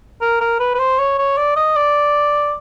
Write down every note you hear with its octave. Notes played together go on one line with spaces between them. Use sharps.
A#4
A#4
B4
B4
C5
C#5
C#5
D5
D#5
D5